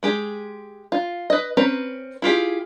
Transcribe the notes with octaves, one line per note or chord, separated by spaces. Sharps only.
G#3 G4 G#4
F4
B4 D#5
C4 C#4 B4 A#5
E4 F4 G4 G#4